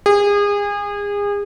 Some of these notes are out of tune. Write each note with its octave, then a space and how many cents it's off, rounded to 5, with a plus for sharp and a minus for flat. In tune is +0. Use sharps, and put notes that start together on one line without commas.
G#4 -30